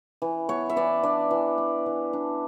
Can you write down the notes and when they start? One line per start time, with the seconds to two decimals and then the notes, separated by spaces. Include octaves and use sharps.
0.22 E3
0.49 B3 C#5
0.69 E5
0.76 E3 D5
1.03 D4 D5
1.31 E3
1.58 B3
1.86 E3
2.13 D4